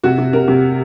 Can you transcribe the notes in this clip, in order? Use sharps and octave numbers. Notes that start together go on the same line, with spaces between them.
C3 F#4
C3
C3 A#4
C3